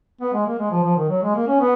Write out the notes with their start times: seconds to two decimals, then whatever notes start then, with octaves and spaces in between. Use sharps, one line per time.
0.21 B3
0.33 G#3
0.46 A#3
0.59 G#3
0.71 F3
0.84 F3
0.97 D#3
1.09 F#3
1.22 G#3
1.35 A#3
1.47 C#4
1.60 B3